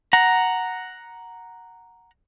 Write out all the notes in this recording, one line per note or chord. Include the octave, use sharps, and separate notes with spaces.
F#5 A#5